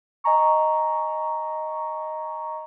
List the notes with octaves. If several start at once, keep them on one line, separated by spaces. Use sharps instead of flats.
D#5 G#5 A#5 C#6